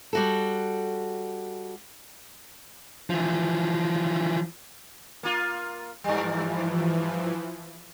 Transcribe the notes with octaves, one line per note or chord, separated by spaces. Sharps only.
G3 F#4 A4
E3 F3
A#3 F4
G2 E3 F3 G3